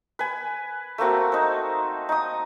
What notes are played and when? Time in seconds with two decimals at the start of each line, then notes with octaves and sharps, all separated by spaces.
0.19 B4 G#5
0.98 A3 A#3 C4 F#4
1.32 D#4 C5
2.09 D#4 D#6